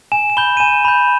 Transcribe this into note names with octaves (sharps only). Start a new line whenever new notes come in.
G#5 E7
E7
B5 G6 G7
D#7
G#5 E7
B5 G6